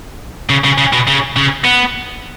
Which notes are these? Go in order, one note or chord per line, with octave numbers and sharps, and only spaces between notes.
C#3
C#3
C#3
B2
C#3
C#3
B3